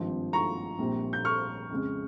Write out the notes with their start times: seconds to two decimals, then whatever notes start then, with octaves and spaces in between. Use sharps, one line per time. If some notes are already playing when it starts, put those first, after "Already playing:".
Already playing: G#1 G2 F3 C4
0.33 A#5 C#6
0.79 A#1 A#2 G3 C4
1.13 G6
1.25 C#6 F6
1.71 F2 C#3 G#3